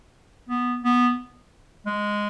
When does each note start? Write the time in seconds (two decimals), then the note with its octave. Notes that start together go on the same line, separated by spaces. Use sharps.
0.49 B3
0.84 B3
1.86 G#3